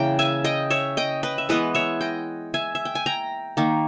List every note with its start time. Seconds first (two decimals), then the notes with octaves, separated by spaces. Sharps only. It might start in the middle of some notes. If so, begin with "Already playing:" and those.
Already playing: C#3 E3 A#3 G5 A#5
0.19 E5 G#5
0.44 D#5 G5
0.70 C#5 E5
0.97 D#5 G5
1.23 B4 D#5
1.38 E5
1.49 E3 G#3 B3 B4 D#5
1.75 C#5 E5
2.01 D#5 G5
2.54 E5 G#5
2.75 E5
2.85 G5
2.95 G#5
3.06 G5 A#5
3.57 D#3 A#3